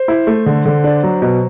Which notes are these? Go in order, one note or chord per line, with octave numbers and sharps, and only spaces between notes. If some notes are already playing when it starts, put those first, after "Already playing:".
Already playing: C5
E4
A3
D3
D3
D4
F#3
B2